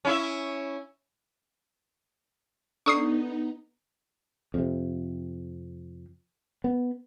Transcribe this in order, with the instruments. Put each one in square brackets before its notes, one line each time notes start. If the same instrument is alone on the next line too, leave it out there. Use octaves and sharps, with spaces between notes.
[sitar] C#4 E4 E5
[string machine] B3 D#4 [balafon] D4 A4 D5 [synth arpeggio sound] C#6 D#6 C7
[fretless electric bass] F2 C3
B3